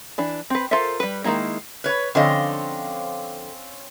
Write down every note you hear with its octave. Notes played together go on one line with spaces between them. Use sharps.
E3 D4
C4 B4
F4 A4 A#4 C5 E5
G3 B4
D#3 F3 G#3 A#3 E4
B4 C#5
D3 F3 C4 C#4 D#5 F5